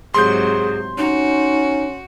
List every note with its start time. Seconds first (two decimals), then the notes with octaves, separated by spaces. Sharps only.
0.14 G#2 C3 F#3 G#4 C6 G6
0.98 C#4 D#4 F#4